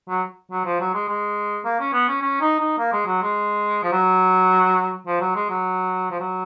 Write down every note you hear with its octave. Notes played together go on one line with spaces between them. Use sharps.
F#3
F#3
F3
F#3
G#3
G#3
A#3
C#4
B3
C#4
C#4
D#4
D#4
A#3
G#3
F#3
G#3
F3
F#3
F3
F#3
G#3
F#3
F3
F#3